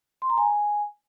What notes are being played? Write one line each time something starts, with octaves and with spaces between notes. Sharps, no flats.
C6
A#5
G#5